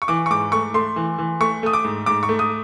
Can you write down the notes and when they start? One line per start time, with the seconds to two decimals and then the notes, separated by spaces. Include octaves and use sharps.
0.02 C#6
0.08 E3 D6
0.26 C#6
0.30 G#2 D6
0.52 A3 C#6
0.74 A3 C6
0.96 E3
1.18 E3
1.40 A3 C#6
1.63 A3 D#6
1.73 D6
1.84 G#2
2.06 G#2 D6
2.23 C#6
2.29 A3
2.39 D#6